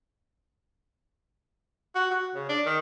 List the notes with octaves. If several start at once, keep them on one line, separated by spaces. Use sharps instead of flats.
F#4
F#4
C#3
D4
D#3